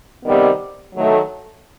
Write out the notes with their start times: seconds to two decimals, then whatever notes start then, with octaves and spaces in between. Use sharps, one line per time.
0.24 C3 D#3 G3 B3
0.93 D#3 F#3 A3